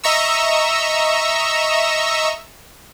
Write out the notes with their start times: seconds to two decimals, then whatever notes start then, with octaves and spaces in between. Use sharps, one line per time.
0.04 D#5 E5 A#5 C#6 E6